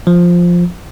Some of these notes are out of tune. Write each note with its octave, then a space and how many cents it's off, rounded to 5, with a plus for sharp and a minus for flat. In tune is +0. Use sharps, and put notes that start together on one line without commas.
F3 +5